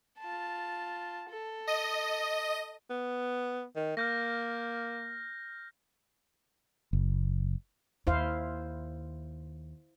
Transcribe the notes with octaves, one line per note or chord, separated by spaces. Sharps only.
F4 A5
A4
D#5
B3
D#3
A#3 F6 G6 A#6
F#1
D#2 E4 C5 F5